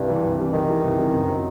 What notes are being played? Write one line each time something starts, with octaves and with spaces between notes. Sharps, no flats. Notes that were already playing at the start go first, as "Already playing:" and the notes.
Already playing: C2 G2
C3 E3 G3
C2
C3 E3 G3
C2 D#3
C3 E3 G3
C2
C3 E3 G3
F#2
F#3 C4